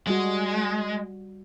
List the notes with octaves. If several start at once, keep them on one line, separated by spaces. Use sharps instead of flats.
G3 G#3 F#4